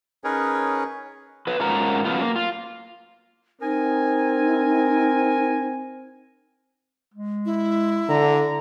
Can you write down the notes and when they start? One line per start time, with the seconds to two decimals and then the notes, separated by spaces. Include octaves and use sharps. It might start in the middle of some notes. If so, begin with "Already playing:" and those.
0.24 C#4 D#4 G#4 A#4 B4 C#5
1.47 F#3 B4
1.60 G#2 C#4 F4 A#4 F#5 A#5
2.05 F#3 B3 C#4 F4
2.22 A#3
2.36 F4
3.62 C4 D#4 A#4 G#5
7.14 G#3
7.45 E4
8.09 D3 A#5